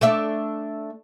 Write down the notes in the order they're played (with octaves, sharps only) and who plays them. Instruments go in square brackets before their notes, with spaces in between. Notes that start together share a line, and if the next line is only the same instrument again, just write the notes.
[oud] A3 D4 E5